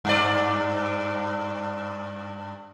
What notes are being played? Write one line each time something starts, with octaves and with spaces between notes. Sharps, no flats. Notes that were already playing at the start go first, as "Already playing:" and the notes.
G2 D5